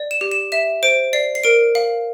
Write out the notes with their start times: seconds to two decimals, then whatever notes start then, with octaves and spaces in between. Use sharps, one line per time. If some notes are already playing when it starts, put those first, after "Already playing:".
Already playing: D5
0.11 E7
0.21 G4
0.32 E7
0.52 E5 E7
0.83 C5 D7
1.13 D5 C7
1.35 C7
1.44 A#4 D7
1.75 F5